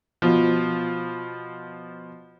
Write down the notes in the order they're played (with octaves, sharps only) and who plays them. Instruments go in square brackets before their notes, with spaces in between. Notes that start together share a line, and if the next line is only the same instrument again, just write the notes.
[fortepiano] B2 F3